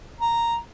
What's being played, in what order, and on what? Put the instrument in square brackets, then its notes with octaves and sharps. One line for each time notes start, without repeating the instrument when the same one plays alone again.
[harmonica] A#5